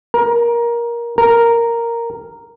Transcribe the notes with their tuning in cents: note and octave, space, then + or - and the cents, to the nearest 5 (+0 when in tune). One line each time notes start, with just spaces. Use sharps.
A#4 +15
A#4 -5